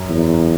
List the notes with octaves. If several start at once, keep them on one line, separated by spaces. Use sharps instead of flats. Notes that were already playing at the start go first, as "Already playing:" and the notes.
Already playing: F#2 F#3
E2